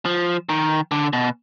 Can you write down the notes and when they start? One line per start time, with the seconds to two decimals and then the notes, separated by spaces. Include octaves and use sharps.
0.06 F3
0.49 D#3
0.91 D3
1.13 B2